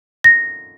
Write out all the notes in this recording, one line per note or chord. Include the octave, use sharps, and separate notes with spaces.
A#6